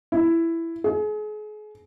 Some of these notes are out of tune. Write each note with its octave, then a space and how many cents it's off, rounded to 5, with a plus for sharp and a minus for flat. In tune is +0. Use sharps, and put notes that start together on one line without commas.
E4 +10
G#4 +35